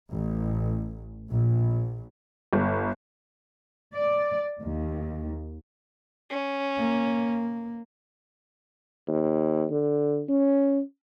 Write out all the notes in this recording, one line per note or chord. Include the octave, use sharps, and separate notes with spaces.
A1
A#1
G1
D5
D#2
C#4
A#3
D#2
D3
C#4